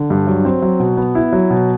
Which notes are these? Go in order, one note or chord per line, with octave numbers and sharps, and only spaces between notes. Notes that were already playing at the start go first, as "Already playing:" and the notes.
Already playing: D3
G2
F#3
C4
F#3
B2
B3
E4
F#3
B2